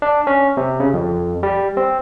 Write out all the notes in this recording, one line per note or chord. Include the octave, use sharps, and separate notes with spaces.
D4
C#4
C3
C#3
F2
G3
C4